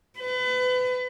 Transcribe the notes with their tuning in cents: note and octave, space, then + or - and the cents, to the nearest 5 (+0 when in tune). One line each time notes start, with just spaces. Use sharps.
B4 +30